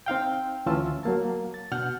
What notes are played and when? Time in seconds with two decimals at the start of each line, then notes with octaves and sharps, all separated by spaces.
0.06 C4 D#4 F5 G5
0.66 D2 E3 C#4 F4 A5 E6
1.03 F#3 A#3 A5
1.54 A6
1.72 B2 D4 F#5 F6 G6